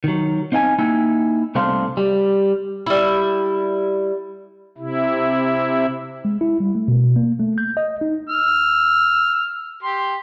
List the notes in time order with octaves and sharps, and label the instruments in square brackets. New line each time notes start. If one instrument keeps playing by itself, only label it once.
[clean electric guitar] D#3 F#3
C4 D#4 F5 G5 G#5
A#3 D#4 E4 G5 G#5
C2 A3 C4 D4 F5 C6
G3
[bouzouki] G3 E4
[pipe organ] C3 E4
[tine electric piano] G#3
E4
G3
A3
B2
A#3
A3
G6
D#5
D#4
[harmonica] E6 F6
G4 C6